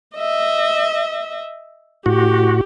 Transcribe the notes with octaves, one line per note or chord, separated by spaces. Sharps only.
D#5 E5
A2 F#4 G4